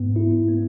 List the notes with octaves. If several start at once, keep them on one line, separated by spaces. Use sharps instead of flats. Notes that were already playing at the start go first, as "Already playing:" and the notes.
Already playing: G#2 B3
E4
B3